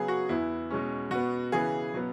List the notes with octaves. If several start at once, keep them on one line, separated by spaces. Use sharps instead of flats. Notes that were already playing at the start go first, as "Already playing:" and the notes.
Already playing: C#3 F#3 B3 G#4
F#4
E2 E3 B3 E4
B2 G#3 C#4
B2 B3 F#4
C#3 E3 B3 G#4
B2 F#3 B3